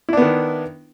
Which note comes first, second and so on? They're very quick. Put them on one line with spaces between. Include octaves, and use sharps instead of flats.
E4 D4 B3 D#3